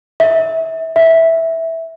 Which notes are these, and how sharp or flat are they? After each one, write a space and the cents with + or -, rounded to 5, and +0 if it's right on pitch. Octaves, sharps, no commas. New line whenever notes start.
E5 -25
E5 -10